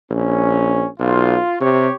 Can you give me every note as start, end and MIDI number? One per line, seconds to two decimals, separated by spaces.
0.10 0.84 34
0.10 0.87 61
0.99 1.37 35
0.99 1.56 65
1.61 1.88 48
1.61 1.95 67
1.61 1.95 73